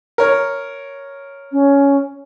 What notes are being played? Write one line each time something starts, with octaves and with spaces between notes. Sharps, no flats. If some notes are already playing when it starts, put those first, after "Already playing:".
A#4 C#5
C#4